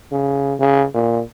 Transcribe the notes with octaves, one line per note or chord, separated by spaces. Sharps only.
C#3
C#3
A#2